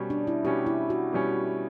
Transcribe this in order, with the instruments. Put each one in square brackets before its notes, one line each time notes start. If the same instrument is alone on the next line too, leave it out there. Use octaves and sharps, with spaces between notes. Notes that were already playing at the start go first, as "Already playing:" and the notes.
Already playing: [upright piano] B2 G3 C#4
[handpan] D4
E4
[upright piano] B2 G3 C#4 [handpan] G4
[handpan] E4
F#4
[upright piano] B2 G3 C#4